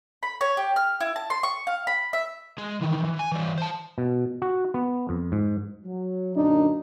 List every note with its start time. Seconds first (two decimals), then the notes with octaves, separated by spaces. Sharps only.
0.23 B5
0.41 C#5
0.57 G4
0.76 F6
1.00 E4
1.16 A5
1.30 C6
1.43 C#6
1.67 F5
1.87 B5
2.13 E5
2.58 G#3
2.81 D#3 E3
3.04 E3
3.19 G#5
3.32 E3 G3
3.58 C5 A5
3.98 B2
4.42 F#4
4.74 B3
5.09 F2
5.32 G#2
5.85 F#3
6.36 F#2 A#2 D3 D4 D#4